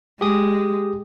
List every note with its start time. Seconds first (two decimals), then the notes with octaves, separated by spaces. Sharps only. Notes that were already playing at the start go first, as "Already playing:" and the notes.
0.21 G#3 G4 G#4 D#6